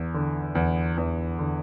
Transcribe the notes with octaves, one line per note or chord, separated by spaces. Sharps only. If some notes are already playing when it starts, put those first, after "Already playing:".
Already playing: E2
D3
E2
E2
D3